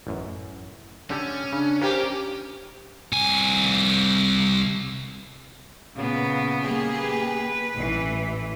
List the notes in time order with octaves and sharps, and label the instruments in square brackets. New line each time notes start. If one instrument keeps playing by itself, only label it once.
[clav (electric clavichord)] A1 F#2
[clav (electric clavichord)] D3 G4 A4 [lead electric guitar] C#4
[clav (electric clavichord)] C#3 [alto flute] D4
[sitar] A#3 G4 [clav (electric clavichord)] D4 F5 [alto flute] C5
[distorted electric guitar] C2 G#5
[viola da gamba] A#2 C#3 B3
[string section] A#3 G4 G#4
[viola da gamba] B4
[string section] A1 E3